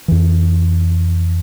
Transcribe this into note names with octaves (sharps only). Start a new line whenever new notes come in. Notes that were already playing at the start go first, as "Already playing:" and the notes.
F2 E3